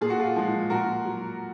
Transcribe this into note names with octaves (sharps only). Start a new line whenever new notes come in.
A#2 G#4
F#4
F4 G#4
F3 G#3
A#2 F#4 A#4
F#3